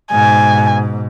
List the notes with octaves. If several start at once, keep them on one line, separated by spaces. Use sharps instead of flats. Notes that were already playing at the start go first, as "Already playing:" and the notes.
G#2 B2 G#5